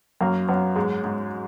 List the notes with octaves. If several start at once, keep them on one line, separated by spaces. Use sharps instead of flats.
F#2 A#3
F#2 B3
G#2 G#3
G#2